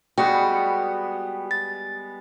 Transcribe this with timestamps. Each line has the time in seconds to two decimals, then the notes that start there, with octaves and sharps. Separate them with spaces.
0.18 G3 G#3 B3 F#4 G5
1.51 A6